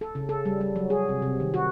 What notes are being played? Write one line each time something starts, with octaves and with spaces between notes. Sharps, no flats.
A4
C#3
A4
G3
G3
F#3
G#4
C3
C3
D#3
F#4